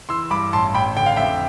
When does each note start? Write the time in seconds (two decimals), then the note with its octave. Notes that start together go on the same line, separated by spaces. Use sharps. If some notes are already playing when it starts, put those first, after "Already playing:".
0.09 E3 C6 E6
0.31 G2 B5 D6
0.53 A1 A5 C6
0.74 A1 G5 B5
0.96 D3 G5
1.06 F5
1.16 F2 E5 G5